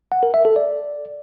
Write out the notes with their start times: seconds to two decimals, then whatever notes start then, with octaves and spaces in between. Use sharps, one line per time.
0.12 F#5
0.23 A#4
0.34 E5
0.45 A4
0.56 D5